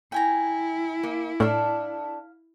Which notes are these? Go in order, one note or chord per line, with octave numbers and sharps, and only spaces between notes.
E4 G5 G#5 A#5
A#3
A2 D4 A4 F5